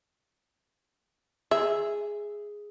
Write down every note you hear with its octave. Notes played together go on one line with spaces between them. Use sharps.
G#4 E5